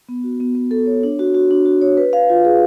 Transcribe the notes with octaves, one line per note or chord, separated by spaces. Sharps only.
B3
F#4
B3
B3
A4
C#5
D4
F#4
F#4
D4
F#4
C#5
B4
F5
F4
G#4